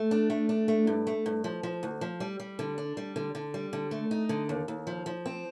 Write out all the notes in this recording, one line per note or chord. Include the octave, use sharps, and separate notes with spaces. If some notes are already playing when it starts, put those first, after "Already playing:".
Already playing: A3
D4
A3
D4
A3
G2
A3
G2
F3
F3
D2
F3
G3
G3
D3
D4
G3
D3
D3
G3
D3
A3
D#4
D3
D#2
D#2
F3
F3
C4